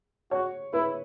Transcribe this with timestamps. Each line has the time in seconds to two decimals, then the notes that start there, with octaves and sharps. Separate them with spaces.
0.31 F#4 C#5
0.73 E4 B4